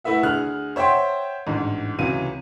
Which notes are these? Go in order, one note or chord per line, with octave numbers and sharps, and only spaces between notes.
A3 E4 B4 E5 F#5
D2 G#4 F6 F#6
C5 C#5 E5 F#5 G5 C6
A1 D2 G#2
C#2 C3 E3 F#3 D#7